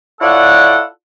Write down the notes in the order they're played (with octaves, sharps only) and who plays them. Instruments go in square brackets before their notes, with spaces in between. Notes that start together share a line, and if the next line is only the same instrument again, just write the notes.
[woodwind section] E4 F4 A4 C#5 D5 F#5